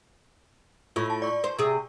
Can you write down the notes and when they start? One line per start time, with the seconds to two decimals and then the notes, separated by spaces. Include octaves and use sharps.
0.96 A2 F4 C#6
1.10 A5
1.22 D5 C#6
1.44 C5
1.59 C3 G#4